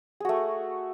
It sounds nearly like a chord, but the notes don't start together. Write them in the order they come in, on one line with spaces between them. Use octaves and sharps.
G#4 F#4 A3